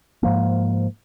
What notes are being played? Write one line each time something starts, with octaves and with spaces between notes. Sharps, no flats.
G#2 F3 A#3